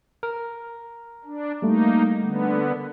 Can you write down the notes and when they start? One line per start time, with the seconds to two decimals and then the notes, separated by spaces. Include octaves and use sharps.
0.23 A#4
1.25 D4
1.62 G3 A3 A#3 D#4
2.22 D3 B3